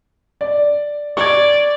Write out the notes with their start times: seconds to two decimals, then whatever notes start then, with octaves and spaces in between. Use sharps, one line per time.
0.41 D5
1.17 D5 C#6 G#6